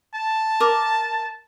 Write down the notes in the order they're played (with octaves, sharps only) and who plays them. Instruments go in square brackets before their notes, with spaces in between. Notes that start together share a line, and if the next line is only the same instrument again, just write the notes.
[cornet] A5
[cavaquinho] A#4 D6